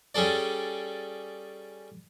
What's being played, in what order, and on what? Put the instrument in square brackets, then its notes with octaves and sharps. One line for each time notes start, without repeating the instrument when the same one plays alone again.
[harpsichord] G3 C#4 G#4 A4 D5